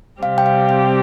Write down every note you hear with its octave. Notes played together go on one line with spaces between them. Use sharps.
C3 G3 C4 G4 F5
G5
F5
G5